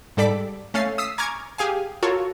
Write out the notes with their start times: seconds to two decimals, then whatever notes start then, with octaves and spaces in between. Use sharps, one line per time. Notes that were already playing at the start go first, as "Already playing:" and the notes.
0.17 G#2 G3 A4 D5 D6 B6
0.74 A3 C#4 F5 A6 C7
0.98 D#6 E6 B6 C7
1.18 G#5 A#5 C#6 D6 F6 G#6
1.58 G4 G#4 F5 G#5
2.03 F4 F#4 A4 A#4 C#5